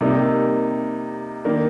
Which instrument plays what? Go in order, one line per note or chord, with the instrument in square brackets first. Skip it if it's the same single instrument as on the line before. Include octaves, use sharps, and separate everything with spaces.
[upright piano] C3 G3 A#3 D#4
D#3 A#3 D4